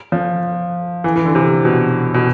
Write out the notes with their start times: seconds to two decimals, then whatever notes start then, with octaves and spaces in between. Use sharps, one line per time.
0.12 F3
1.04 E3
1.16 E3
1.25 D3
1.35 C3
1.65 B2
2.14 B2